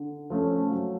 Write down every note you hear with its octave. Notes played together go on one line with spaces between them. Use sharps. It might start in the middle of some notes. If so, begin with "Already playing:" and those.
Already playing: D3
F3 A3 C#4
F#3